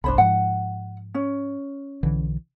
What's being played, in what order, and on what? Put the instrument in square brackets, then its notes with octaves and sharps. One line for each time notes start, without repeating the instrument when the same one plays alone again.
[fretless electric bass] G1 C2 [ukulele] D4 C5 B5
[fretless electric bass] G#2 F3 [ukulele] F#5
[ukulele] C#4
[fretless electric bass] B1 D3 E3